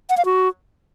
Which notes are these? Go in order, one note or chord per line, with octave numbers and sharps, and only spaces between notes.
F#5
F5
F#4